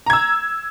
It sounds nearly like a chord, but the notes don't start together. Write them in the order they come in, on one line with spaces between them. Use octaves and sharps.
A#5 G#6 E6